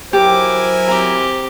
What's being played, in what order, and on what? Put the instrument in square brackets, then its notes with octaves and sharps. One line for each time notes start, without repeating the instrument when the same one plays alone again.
[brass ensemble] F#3 C5 [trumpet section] E4 A#4 G#5 [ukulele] G4 [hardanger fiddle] D6
[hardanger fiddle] C4 G4 [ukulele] A#5